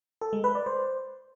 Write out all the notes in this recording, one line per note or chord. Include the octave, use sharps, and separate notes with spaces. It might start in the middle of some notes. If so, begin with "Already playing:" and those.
A4
G#3
B4
D5
C5